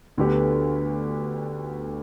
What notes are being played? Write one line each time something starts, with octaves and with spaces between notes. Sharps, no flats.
D2 D3 B3 G4 B4